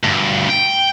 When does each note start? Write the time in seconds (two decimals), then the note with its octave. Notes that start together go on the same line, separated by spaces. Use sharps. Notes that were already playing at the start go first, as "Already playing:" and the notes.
0.04 D2 G2
0.50 G5